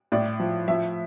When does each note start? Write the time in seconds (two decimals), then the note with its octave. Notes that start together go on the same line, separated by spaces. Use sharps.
0.12 A2 D5
0.40 F3
0.68 F3 E5